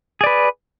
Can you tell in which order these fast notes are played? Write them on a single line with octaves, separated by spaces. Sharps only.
G#4 D5 B4